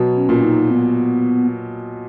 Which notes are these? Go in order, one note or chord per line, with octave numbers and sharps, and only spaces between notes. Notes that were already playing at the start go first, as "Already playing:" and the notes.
Already playing: B2 F#3
C#4
A#2
D#4
B3